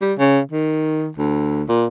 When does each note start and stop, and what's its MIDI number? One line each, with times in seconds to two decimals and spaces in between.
0.02 0.14 55
0.19 0.40 49
0.52 1.10 51
1.17 1.63 38
1.69 1.86 46